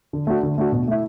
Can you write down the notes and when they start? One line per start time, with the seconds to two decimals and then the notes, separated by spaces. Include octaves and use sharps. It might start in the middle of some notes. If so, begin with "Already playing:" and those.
0.13 D3
0.27 A3 D4 F#4
0.43 D3
0.58 A3 D4 F#4
0.72 B2
0.88 A3 E4